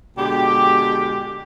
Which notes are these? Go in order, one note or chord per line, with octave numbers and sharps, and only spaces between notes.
B2 D3 G#3 G4